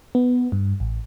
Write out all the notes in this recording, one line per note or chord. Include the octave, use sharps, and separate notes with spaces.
B3
G2
A1